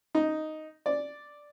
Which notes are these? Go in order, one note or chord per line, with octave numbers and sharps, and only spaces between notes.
D#4
D5